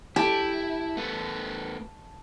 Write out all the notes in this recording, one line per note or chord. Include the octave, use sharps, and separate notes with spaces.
E4 G4 A5
A3 B3